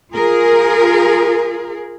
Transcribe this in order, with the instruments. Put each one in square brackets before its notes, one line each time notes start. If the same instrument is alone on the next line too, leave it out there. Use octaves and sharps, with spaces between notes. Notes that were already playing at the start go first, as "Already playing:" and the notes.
[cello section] F4 G#4 A#4